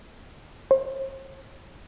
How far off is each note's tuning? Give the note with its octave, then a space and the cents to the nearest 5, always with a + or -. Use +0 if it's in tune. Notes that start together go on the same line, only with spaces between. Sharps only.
C5 +45